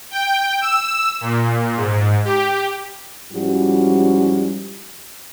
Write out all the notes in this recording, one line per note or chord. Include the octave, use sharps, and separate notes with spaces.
G5
E6
A#2
G#2
G4
G#2 F3 G3 C#4 E4 F#4